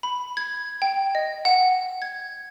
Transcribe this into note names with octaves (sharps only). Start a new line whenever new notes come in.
B5
G#6
G5
D#5
F#5
G#6